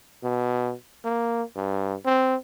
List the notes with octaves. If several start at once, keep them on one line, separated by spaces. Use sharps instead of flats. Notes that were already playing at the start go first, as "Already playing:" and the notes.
B2
A#3
G2
C4